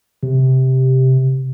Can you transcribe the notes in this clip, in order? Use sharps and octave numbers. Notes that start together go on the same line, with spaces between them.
C3